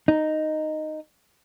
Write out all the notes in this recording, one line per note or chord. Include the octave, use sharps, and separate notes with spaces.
D#4